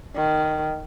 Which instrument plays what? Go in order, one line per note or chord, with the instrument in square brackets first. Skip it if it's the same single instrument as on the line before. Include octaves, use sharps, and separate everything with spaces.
[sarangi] D#3